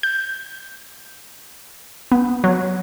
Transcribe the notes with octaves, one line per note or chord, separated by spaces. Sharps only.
G6
B3
F#3